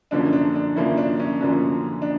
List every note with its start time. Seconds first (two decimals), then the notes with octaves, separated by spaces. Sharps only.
0.11 F#2 D3 F3 A#3 C#4 D4
0.33 D4
0.55 D4
0.76 F#2 D3 F3 A#3 C#4 E4
0.97 D4
1.20 C#4
1.41 F#2 D3 F3 A#3 C#4 D4
2.02 D4